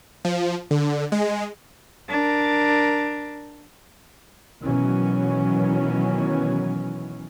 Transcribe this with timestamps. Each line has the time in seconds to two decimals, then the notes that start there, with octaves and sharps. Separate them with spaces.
0.25 F3
0.71 D3
1.12 G#3
2.09 D4 A#4
4.60 B2 D#3 E3 F#3 C#4